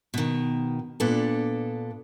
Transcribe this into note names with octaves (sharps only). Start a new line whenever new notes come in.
B2 D#3
A#2 B3 D4 A4